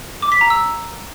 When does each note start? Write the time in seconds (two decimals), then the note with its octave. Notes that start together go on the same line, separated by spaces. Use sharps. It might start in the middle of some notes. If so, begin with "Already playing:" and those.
0.22 D6
0.32 B6
0.41 A#5
0.50 E6